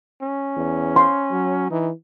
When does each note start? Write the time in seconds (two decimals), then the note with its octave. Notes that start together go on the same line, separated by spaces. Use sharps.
0.22 C#4
0.56 E2
0.96 C6
1.31 F#3
1.70 E3 D#4